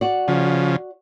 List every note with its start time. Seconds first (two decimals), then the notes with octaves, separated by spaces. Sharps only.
0.01 F#4 D5
0.28 C#3 F3